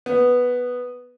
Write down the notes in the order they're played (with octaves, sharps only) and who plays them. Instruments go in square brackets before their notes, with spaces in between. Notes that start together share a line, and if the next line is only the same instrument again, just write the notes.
[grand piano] B3